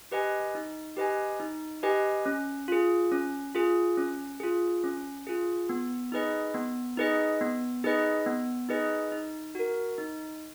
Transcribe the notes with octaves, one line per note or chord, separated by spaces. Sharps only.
G4 B4 D#5 G#5
D#4
G4 B4 D#5 G#5
D#4
G4 B4 D#5 G#5
C#4
F4 G#4
C#4
F4 G#4
C#4
F4 G#4
C#4
F4 G#4
B3
D#4 G#4 B4 D#5
B3
D#4 G#4 B4 D#5
B3
D#4 G#4 B4 D#5
B3
D#4 G#4 B4 D#5
D#4
F#4 A#4
D#4